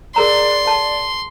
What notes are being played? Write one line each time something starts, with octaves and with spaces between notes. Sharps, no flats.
G#4 A#4 D5 A#5 C6
F5 A5